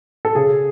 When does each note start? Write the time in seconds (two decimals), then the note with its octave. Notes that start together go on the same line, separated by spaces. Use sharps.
0.25 A4
0.35 C#3 G#4